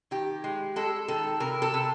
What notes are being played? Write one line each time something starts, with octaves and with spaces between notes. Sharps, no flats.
D#3 G4
G#3
G#3 A4
D#3 A4
C3 A#4
A4
C3